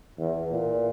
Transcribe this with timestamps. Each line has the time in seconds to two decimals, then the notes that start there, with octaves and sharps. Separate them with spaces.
0.18 E2
0.51 A#2